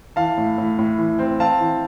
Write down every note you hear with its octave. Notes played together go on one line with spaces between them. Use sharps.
E3 F5 A5
A2
A2
A2
E3
C4
C4 F5 A5
E3